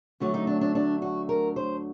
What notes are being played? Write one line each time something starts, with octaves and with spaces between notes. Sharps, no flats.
D2 D3 F#3 A3 F#4
D#4
D4
D4
D4
F#4
A#4
C5